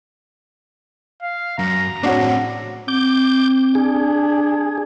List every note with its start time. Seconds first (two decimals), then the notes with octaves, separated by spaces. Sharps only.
1.22 F5
1.59 F#2 A#5
2.03 A2 C4 D4 F#4 C#5
2.88 C4 D6 G6
3.75 D4 G#4